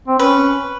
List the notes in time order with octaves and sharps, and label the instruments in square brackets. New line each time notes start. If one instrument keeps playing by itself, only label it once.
[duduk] C4
[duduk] C#4 [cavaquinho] B4